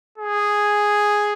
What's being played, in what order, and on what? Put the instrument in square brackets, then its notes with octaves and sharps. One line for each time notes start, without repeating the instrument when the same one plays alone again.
[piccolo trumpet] G#4